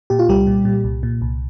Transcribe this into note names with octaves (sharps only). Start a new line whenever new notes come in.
A#2 G4
F4
C2 G3 G4
A#2
A#2
C2
A#2
C2